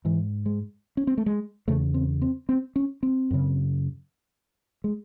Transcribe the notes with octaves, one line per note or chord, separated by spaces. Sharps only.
G#2 E3
G#3
C#4
C4
A3
G#3
E2 C#3 A3
C4
C4
C4
C#4
C4
F#2 C#3
G#3